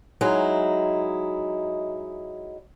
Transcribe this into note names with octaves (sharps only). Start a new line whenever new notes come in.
F#3 G#3 D#4 E4